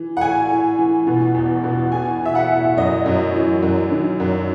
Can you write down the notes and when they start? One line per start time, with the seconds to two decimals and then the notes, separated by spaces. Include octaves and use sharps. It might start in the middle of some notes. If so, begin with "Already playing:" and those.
Already playing: E3
0.17 F#5
0.21 A2 G#5
0.50 A2
0.78 E3
1.07 B2
1.35 E2
1.64 B2
1.92 E3 G#5
2.21 E3 E5
2.35 F#5
2.50 A2
2.77 F#2 D#5
3.06 F#2
3.35 E3
3.63 F#2
3.91 D#3
4.20 F#2